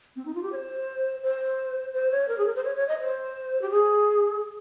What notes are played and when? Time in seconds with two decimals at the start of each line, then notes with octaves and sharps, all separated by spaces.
0.16 C4
0.26 D#4
0.35 F4
0.43 G4
0.52 C#5
0.56 C5
1.23 C5
1.93 C5
2.12 C#5
2.28 A#4
2.38 G#4
2.46 A#4
2.55 C5
2.64 C#5
2.76 C#5
2.88 D#5
3.00 C5
3.62 G4
3.70 G#4